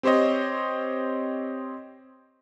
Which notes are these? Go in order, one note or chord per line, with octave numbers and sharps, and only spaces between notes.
C4 G4 C5 C#5 D#5